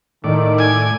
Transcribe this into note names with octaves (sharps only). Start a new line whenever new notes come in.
A2 D#3 D5
G#5